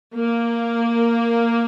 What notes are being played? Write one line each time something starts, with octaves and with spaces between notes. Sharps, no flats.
A#3